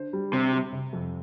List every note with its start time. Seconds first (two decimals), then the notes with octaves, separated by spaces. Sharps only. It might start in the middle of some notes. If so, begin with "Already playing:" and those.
Already playing: D3 C5
0.13 G3
0.33 C3 G3
0.53 G3
0.72 C3
0.93 F2